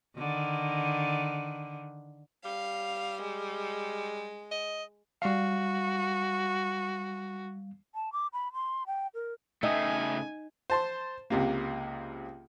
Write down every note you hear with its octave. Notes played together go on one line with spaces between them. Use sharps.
D3 D#3
G3 F5
G#3
D#5
G3 F#4 F5
A5
D6
B5
C6
G5
A#4
C#3 A3 D#4 E5 G5 G#5 D#6
C5 A5 C6
C#2 C3 A#3